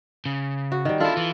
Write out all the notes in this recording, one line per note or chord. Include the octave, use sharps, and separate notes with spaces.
C#3
F#4
D#3 G3
D4 E4 F4 A4
E3